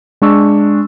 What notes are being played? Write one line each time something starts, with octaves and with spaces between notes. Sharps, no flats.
G#3 D4 C#6 E6